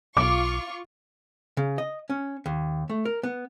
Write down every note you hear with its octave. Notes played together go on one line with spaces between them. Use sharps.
B1 F4 C#6 D6
C#3
D#5
C#4
D#2
A3
A#4
B3